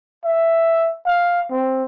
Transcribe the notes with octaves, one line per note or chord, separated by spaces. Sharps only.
E5
F5
C4